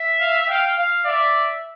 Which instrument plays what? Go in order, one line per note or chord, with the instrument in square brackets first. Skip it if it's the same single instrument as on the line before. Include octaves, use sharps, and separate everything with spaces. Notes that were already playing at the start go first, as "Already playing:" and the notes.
Already playing: [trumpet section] E5
[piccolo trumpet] F5
[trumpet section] F5 [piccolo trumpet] G5
[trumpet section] F5
[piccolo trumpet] D5 [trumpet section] E5